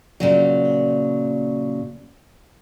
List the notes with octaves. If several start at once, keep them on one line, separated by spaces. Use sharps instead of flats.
A#2 C#3 F#3